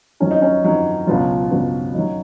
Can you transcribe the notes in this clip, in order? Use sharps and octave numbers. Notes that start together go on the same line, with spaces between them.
F2 D#3 F#3 C#4
D#4
C#4
F2 D#3 F#3
C#2 B2 F#3 F4
C#2 B2 F#3
F#2 D#3 F#3 D#4